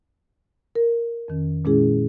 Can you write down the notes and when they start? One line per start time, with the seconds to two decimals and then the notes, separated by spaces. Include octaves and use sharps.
0.75 A#4
1.28 F2 D#3 C#4
1.65 A#2 G#3 C#4 E4 G#4